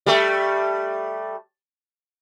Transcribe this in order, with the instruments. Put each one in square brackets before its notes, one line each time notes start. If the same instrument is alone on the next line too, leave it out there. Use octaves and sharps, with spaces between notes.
[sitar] G3 A3